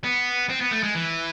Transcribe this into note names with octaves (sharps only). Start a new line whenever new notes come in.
B3
C4
B3
A3
G#3
E3